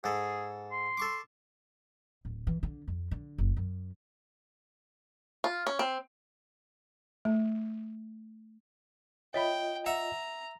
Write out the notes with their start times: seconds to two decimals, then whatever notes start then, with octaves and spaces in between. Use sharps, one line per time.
0.04 G#2 G#4 A4
0.71 C6
0.97 A4 C#6 D6
2.25 D1
2.47 E3
2.63 D3
2.88 F2
3.11 D3
3.38 F#1
3.57 F#2
5.44 F4
5.67 C#4
5.79 C4
7.25 A3
9.34 F4 C#5 D#5 E5 G5 B5
9.86 E5 F#5 A#5